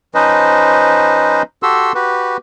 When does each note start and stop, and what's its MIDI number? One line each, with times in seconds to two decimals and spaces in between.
0.15 1.42 53
0.15 1.42 61
0.15 1.42 63
0.15 1.42 71
0.15 1.42 72
0.15 1.42 75
1.63 1.92 66
1.63 1.92 67
1.63 1.92 69
1.63 1.92 84
1.63 1.92 88
1.95 2.37 66
1.95 2.37 67
1.95 2.37 71